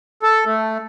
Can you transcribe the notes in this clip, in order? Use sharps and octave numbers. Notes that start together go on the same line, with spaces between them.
A4
A3